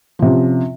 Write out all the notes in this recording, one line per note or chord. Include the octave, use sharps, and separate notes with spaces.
C3 F3 C#4